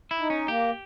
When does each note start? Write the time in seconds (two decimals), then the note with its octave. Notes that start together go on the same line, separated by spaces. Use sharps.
0.11 E4
0.20 D#4
0.30 C#4
0.48 A#3 G4